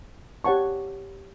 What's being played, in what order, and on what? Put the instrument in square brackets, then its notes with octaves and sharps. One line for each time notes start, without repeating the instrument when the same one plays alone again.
[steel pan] G4 C#5 F#5 A5 C#6